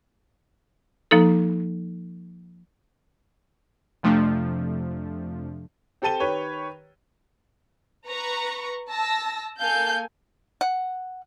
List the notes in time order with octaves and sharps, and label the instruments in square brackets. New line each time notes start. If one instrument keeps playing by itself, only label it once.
[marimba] F3 A#3 D#4 A4
[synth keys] F2 C3 F3 A3 D4
[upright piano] C4 G4 A4 A5 D#7 G7
D#3 G4 B4 C#5
[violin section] B4 A#5 C#6
A5 E6 A#6
A#3 A4 F5 G#5 G6
[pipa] F#5